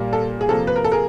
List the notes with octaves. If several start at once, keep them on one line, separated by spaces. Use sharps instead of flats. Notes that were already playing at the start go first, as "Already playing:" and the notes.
Already playing: A#2 G3 A#3
A4
G#4
C3 F3 A#3 A4
B4
A#4
A4
G#4 A#4